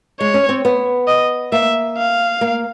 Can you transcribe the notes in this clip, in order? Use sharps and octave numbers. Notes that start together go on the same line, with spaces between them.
G#3 C#5
C#4
C4
B3
D#5
A#3 E5
F5
A#3